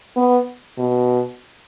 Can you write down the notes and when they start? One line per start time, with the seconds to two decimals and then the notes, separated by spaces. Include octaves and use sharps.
0.16 B3
0.78 B2